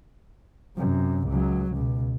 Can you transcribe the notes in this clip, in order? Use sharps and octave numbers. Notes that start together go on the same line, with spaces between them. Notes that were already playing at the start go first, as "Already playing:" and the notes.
F#2 C3
C#2 F#3
C#2 B2